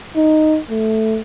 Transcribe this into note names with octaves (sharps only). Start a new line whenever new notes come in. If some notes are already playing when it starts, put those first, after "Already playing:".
D#4
A3